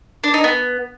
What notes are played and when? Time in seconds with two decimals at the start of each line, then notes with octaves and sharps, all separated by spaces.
0.24 D4
0.34 D#4
0.44 B3